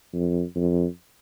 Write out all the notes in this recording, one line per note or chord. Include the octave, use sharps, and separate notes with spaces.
F2
F2